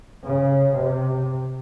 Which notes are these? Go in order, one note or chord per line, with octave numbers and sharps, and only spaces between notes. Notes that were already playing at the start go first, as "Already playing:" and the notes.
C#3
C3